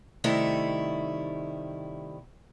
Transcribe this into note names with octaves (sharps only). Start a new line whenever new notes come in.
C3 D#3 G3 A3 E4